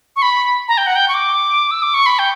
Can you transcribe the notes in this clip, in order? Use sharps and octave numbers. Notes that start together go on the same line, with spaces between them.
C#6
B5
A#5
G5
F#5
G5
C#6
D6
E6
D6
C#6
B5
G5